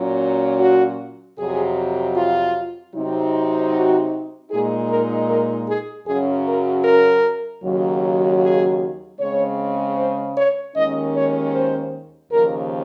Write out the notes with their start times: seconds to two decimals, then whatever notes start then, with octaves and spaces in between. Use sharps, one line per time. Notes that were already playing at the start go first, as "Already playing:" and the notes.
Already playing: A#2 F#3 C#4
0.60 F#4
1.38 F2 C3 F#3 G#4
2.16 F4
2.94 C3 F#3 C4 D#4
3.73 F#4
4.51 A#2 G#3 D#4 G#4
4.90 A#4
5.28 A#4
5.68 G#4
6.07 F#2 C#3 F#3 C#4 G#4
6.46 A#4
6.85 A#4
7.63 D#2 C#3 F#3
8.41 G#4
9.19 C#3 G#3 C4 C#5
9.97 C5
10.36 C#5
10.76 D#2 D#3 G#3 C#4 D#5
11.15 C#5
11.54 C5
12.32 D#2 C#3 F3 A#4